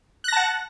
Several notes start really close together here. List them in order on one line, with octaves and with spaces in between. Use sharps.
F#6 A#6 A5 F#5